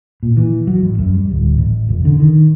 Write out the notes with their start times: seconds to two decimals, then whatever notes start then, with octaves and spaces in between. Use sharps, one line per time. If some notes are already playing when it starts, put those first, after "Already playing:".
0.23 A#2
0.37 E3
0.67 F#3
0.83 A1
0.99 F#2
1.13 G3
1.31 D1
1.58 A1
1.89 F1
2.05 D3
2.20 D#3